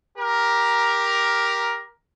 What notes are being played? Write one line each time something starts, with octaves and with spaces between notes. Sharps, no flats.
G4 A#4